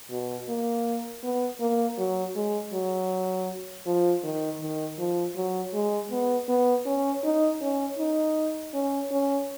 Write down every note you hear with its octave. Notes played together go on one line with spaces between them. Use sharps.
B2
A#3
B3
A#3
F#3
G#3
F#3
F3
D#3
D#3
F3
F#3
G#3
B3
B3
C#4
D#4
C#4
D#4
C#4
C#4